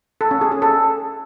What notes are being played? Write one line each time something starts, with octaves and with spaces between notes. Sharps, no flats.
A4
C#4
G#4
G#4
A4